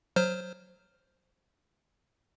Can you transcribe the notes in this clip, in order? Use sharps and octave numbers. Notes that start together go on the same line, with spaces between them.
F#3 C5 F6